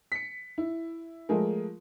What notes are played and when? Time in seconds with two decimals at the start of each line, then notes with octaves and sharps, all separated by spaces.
0.12 B6 C#7
0.58 E4
1.29 F3 G#3 A3 G#4 A#4